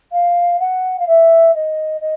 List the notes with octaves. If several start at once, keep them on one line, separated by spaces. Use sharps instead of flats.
F5
F#5
F5
E5
D#5
D#5